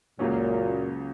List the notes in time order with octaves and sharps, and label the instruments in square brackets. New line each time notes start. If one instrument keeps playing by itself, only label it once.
[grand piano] C#2 C#3 F#3 A#3 C#4 [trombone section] F#2 A#2